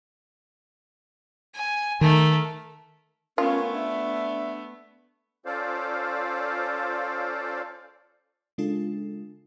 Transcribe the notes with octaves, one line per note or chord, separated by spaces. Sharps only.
G#5
D#3 A3 A#4
A3 B3 C#4 F4 A#4
D4 E5
C#4 F4 A4 C5 D5 F5
C#3 G#3 D4 F4 A4